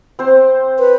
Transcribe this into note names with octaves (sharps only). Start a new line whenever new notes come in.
C4 C5
B4